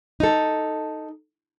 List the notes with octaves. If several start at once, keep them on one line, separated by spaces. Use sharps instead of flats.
D#4 A4